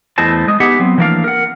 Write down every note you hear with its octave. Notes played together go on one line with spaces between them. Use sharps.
E2 A3 E4 C5 D#5 A5
G#3 D#5
B3 D#4 G4 G#4 E5 F#5
F#3 B3 C4
E3 F3 A3 A#3 D4 F5
A#4 F#5